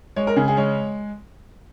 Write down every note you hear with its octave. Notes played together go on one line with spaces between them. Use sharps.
G#3 C#5
A#4
C#3 G#4
G#4
G#3 C#5